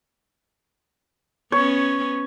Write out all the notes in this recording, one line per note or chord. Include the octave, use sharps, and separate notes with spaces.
B3 C#4 C#5